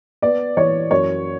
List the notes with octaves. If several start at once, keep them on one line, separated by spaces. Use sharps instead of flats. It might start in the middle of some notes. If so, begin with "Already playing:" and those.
B3 D5
E3 C#5
F#2 C#5